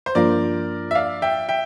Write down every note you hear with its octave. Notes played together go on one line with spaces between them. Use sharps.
C5
G2 F3 A#3 D4 F4 A#4 D5
E5
D5 F5
E5 G5
E5 G5